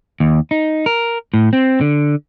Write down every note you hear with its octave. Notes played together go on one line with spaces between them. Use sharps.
D#2
D#4
A#4
A2
C4
D3